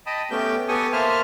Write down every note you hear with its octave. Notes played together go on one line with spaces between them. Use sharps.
D#5 G5 A5 B5 D#6
A3 B3 C#4 G4 G5 G6
B3 G4 A4 G#5 C#6 D#6
A#3 C5 E5 G#5 A5 F6